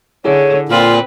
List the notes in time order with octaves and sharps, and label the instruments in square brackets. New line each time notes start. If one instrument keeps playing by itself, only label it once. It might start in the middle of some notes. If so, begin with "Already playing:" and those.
[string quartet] D3 [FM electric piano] E4 G#4 A4 [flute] C#5
[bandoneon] A#2 [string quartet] C4 B4 [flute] F4